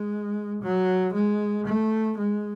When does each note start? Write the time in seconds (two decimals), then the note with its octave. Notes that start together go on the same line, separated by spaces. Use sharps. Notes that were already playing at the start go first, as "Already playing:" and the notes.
Already playing: G#3
0.63 F#3
1.14 G#3
1.67 A3
2.18 G#3